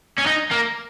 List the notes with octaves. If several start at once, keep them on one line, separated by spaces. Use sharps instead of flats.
C#4
D#4
A#3